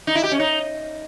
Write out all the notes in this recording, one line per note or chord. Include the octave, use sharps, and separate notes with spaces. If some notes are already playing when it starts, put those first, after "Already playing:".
D#4
E4
G4
C#4
D#4